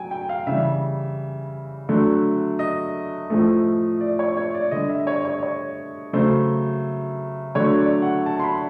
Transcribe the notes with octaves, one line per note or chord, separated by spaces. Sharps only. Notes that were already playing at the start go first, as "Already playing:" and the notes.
Already playing: F#3 G5 G#5
G5
F5
C#3 E3 G3 E5
D3 F#3 A3
D#5
A2 F3 A3
D5
C#5
C#5
D5
D3 G3 D#5
E5
C#5
C#5
C#5
C#3 F#3 A3 C5
D3 F#3 A3 C#5
D5
F#5
A5
C6
B5